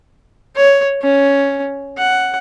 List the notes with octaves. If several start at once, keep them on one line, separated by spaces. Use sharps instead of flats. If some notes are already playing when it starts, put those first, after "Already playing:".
C#5
C#4
F#5